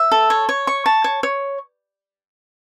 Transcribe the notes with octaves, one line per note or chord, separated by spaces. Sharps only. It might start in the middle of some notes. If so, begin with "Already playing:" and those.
Already playing: E5
A4
C#5
C#5
C#6
A5
C#5
C#5